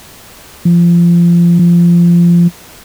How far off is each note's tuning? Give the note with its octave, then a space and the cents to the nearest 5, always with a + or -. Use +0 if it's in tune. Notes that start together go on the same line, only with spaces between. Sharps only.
F3 -25
F3 -20